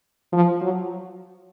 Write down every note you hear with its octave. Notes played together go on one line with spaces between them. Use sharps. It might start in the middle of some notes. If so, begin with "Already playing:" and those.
F3
F#3